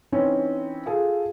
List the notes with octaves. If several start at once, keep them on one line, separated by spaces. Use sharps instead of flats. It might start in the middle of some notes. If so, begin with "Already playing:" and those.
E3 C4 C#4 D#4
F4 G#4 A4